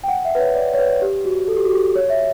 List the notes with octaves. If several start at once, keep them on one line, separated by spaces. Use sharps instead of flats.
G5
F#5
E5
B4
C#5
D5
C#5
B4
G4
F#4
A4
G4
F#4
G4
C#5
E5